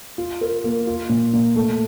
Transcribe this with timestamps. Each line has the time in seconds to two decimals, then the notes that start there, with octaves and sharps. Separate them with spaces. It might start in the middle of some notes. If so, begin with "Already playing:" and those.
0.18 F4
0.41 A#4
0.64 A#3
0.87 F4
1.09 A#2
1.33 A#2
1.56 A3